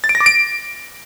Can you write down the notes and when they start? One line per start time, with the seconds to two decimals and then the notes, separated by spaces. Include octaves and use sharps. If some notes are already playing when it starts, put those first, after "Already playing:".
0.04 A6
0.09 D7
0.15 A#6
0.20 D6
0.26 D7